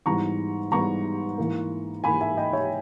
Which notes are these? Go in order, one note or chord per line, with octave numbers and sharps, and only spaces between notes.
G#2 E3 G3 B3 A#5 C#6
G#2 E3 G3 B3 A#5 C#6
G#2 E3 A#3
G#2 E3 A#3 G#5 B5
E5 G#5
D#5 G5
C#5 E5